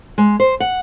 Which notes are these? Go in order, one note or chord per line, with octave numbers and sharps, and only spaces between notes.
G#3
C5
F#5